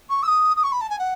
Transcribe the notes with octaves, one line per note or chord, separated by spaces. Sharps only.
C#6
E6
D#6
D#6
C#6
B5
A5
G#5
F#5